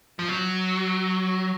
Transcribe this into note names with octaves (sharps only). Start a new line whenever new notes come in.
F3
F#3